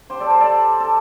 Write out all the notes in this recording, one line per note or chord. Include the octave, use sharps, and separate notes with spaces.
G4 C5
A4 D5
G4 C5
A4 D5
A4